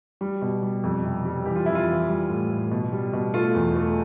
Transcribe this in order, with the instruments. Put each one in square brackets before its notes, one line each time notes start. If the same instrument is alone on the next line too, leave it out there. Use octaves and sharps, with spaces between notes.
[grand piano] G3
B2
G3
F2
C3
G3
E3 G4
F4
F2 E4
F4
E3
G3
A2
A2
B2
G3
B2
A3 F4
E2
A3